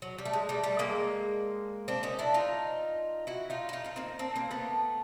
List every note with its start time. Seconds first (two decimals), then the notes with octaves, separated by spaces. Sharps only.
0.02 F#3
0.18 G3
0.25 A3
0.33 G#3
0.49 G3 A3
0.63 G3 A3
0.79 G#3 A#3
1.88 C4 D4
2.03 C#4 D#4
2.19 D4 E4
2.34 D#4 F4
3.27 E4 F#4
3.50 D#4 F4
3.69 E4
3.73 D#4 F4
3.84 D#4 F4
3.96 A#3 C4
4.19 C4 D4
4.36 A#3 C4
4.51 A3 B3